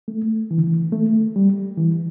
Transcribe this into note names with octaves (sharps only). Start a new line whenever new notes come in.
A3
E3
D3
E3
A3
G3
E3